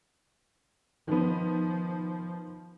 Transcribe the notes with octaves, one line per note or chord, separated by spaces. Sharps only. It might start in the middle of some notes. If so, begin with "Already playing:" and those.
D#3 F3 B3